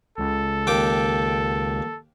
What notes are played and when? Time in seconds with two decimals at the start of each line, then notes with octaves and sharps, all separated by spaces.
0.18 C#2 A4
0.67 D#2 G5 D6